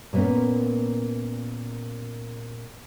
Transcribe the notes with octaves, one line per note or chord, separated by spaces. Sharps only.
A#2 A#3 B3 C#4